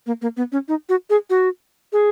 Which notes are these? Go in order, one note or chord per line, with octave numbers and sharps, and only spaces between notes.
A#3
A#3
B3
C#4
D#4
F#4
G#4
F#4
G#4